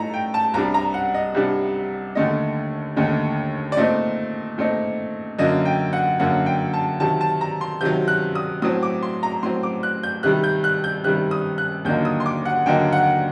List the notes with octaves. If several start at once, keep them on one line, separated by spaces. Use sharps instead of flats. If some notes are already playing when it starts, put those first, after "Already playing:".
Already playing: A2 A3 D#4 A#5
G5
A5
C2 C3 G3 D4 A#5
A#5
F#5
D#5
C2 C3 G3 D4
D#2 D3 A3 D#4 D#5
D#2 D3 A3 D#4
D5
A#2 A3 C4 D#4 D#5
A#2 A3 C4 D#4
F#2 D3 F#3 A#3 D#5
G5
F#5
F#2 D3 F#3 A#3 F#5
G5
A5
C3 D#3 F#3 A5
A5
A#5
C6
C3 D#3 F#3 G6
F#6
D#6
A2 F#3 C4 D#6
D6
C6
A#5
A2 F#3 C4 C6
D6
F#6
G6
C3 D#3 G3 F#6
G6
F#6
G6
C3 D#3 G3 F#6
D#6
F#6
D#2 D3 F#3 A#3 D#4 G6
D#6
C6
D6
F#5
D#2 D3 F#3 A#3 D#4 G5
F#5